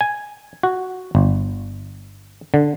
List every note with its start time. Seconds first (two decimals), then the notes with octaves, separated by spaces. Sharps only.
0.01 G#5
0.63 F#4
1.15 G1
2.54 D3